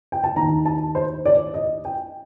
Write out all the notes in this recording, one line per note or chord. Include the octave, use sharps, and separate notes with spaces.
G5
A5
D#2 D#3 A#5
A5
C5
D5
D#5
G5